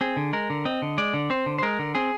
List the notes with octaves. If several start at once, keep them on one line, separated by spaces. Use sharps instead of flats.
C4 G#4
D3
G#3 A#4
D3
C4 D#5
D3
G#3 D5
D3
C4 C5
D3
C5
G#3 A#4
D3
C4 G#4